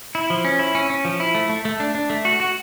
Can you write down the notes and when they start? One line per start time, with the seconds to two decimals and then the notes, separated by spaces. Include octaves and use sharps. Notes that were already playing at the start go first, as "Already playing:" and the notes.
0.15 E4
0.30 F3
0.45 C#4
0.59 E4
0.75 C#4
0.90 C#4
1.05 F3
1.20 E4
1.35 A3
1.49 A3
1.65 A3
1.80 D4
1.95 D4
2.10 A3
2.25 F#4
2.40 F#4